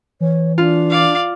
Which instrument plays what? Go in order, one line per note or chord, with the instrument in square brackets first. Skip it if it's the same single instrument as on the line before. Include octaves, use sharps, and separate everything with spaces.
[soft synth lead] E3 [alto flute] C#5
[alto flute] D4 [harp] F4
[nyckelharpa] D5 F5